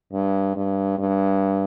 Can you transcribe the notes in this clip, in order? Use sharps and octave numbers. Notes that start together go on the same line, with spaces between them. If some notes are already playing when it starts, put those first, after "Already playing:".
G2
G2
G2